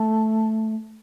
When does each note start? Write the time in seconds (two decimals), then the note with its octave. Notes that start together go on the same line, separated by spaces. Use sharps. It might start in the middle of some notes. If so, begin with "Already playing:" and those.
Already playing: A3